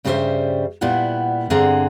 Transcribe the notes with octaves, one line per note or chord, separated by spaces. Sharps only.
G2 C#3 G3 F#4 C5 E5
A#2 G3 B3 E4 F#5
G2 D3 C4 G#4 F#5 A#5